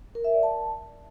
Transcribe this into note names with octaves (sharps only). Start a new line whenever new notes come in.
A#4
E5
D5
A5